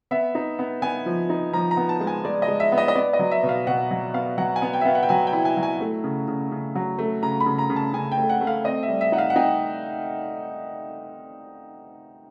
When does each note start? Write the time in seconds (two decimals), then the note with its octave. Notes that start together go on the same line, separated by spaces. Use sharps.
0.11 B3 E5
0.35 D#4
0.59 B3
0.82 B3 G#5
1.06 F3
1.30 D#4
1.53 F3 A#5
1.71 A#5
1.77 B3
1.89 A5
2.01 G#3
2.07 G#5
2.25 G#3 D5
2.42 D#5
2.48 G#3
2.60 E5
2.72 B3
2.78 D#5
2.88 D#5
2.96 B3 D5
3.13 D#5
3.19 F#3
3.31 E5
3.43 B2
3.49 F5
3.67 B2 F#5
3.91 F#3
4.14 B3 F5
4.37 F#3 F#5
4.56 G#5
4.62 B3
4.73 G5
4.81 E5
4.85 B3 F5
4.95 F#5
5.03 G5
5.09 F#3 G#5
5.27 G5
5.33 E4
5.45 G#5
5.57 F#3
5.63 G#5
5.81 A3
6.04 C#3
6.28 C#3
6.52 C#3
6.75 F#3
6.99 A3
7.23 C#3 A#5
7.41 B5
7.46 C#3
7.58 A#5
7.70 C#3
7.76 A5
7.94 C#3 G#5
8.12 G5
8.18 A3
8.30 F#5
8.41 A3
8.47 F5
8.65 C4 D#5
8.83 E5
8.88 G3
9.01 E5
9.12 D#4 F#5
9.18 F5
9.30 F#5
9.36 D#4 G5